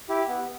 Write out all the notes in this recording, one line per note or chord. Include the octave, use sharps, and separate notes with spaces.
E4 G4
B3